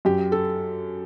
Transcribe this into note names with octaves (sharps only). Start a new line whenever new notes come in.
F#2 G4
A4